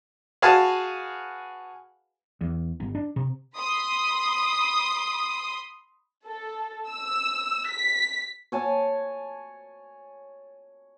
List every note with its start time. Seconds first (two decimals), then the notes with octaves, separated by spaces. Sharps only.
0.42 F#4 G#4 B4 F5 G#5 A5
2.41 E2
2.80 G1
2.95 D4
3.16 C3
3.56 B5 C6 D#6
6.27 A4
6.89 E6
7.69 B6
8.52 C#5 G#5 A5